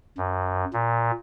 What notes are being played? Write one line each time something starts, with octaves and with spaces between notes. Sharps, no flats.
F#2
A#2